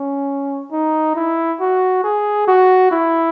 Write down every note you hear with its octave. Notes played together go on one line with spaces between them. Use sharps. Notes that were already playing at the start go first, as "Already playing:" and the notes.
Already playing: C#4
D#4
E4
F#4
G#4
F#4
E4